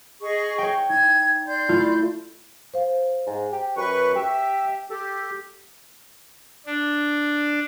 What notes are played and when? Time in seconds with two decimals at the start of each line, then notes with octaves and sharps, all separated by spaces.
0.22 G#4 D#5 C#6
0.58 C#5 G5
0.89 D#4 G#6
1.47 D5 C6 G6
1.69 A3 E4 F4
2.74 C5 F5
3.27 G#2
3.52 G4
3.77 F#2 B4 C#6
4.16 G4 E5
4.90 G4 A4
6.66 D4